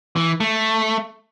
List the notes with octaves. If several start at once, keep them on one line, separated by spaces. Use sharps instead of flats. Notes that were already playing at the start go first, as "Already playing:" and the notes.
E3
A3